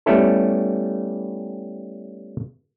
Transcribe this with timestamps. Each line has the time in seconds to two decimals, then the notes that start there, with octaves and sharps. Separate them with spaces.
0.06 G3 A3 B3 C#4 E4 A4